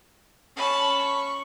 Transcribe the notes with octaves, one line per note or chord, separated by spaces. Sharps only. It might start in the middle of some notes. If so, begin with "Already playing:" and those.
C#4 A5 B5 C#6
C#6